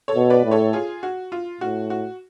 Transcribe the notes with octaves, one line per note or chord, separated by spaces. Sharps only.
A4 C#5
B2
B4 D5
A2
A4 C#5
F4 G#4
F#4
F4
A2 F#4
F#4